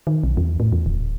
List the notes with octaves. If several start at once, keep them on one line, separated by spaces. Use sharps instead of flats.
D#3
B1
E2
A2
E2
D1